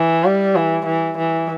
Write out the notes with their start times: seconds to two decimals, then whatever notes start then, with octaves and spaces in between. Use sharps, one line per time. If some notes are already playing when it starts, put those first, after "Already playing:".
Already playing: E3
0.24 G3
0.55 E3
0.86 E3
1.18 E3